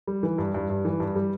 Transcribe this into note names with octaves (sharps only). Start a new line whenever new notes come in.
G3
E3
G2
G2
G2
E3
G2
G3